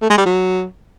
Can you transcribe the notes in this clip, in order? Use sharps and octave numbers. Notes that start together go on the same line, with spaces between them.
A3
G#3
G3
F#3